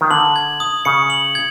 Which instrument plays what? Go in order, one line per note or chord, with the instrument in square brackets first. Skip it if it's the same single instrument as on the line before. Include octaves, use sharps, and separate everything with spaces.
[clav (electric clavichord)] D#3
[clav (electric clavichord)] D3 [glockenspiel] F#7
[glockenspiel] G#6
D#6
[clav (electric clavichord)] C#3 [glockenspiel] C#7
[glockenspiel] F#7
G#6